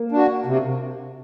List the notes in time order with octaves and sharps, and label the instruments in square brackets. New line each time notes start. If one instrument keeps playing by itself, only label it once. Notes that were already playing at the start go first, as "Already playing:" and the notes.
Already playing: [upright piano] A#3
[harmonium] D4 F#4
C3